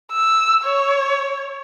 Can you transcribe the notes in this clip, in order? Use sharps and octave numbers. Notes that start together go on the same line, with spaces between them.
E6
C#5